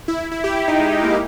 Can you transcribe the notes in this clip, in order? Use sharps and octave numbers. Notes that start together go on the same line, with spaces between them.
E4
E4
E4
G4
E4
D#4
G#3
G#3
A#3